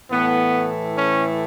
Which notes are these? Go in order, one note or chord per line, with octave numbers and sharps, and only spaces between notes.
A2 E3 A3 B3
C#4